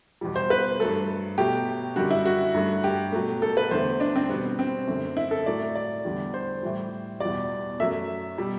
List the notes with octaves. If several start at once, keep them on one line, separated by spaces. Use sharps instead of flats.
E2 B2 G3
C5
B4
G2 F#3 A3 A4
B2 F#3 A3 G4
F#2 D3 G3 F#4
E4
F#4
G2 F#3 A3
G4
B2 F#3 A3
A4
B4
E2 D3 A3 C5
D4
C4
B2 G3 B3
C4
F#2 D3 A3
E4
A4
A2 F#3 A3 D5
D5
E2 D3 G3
C5
A2 E3 G3
E2 B2 G3 D5
F#2 F#3 A3 E5
B2 G3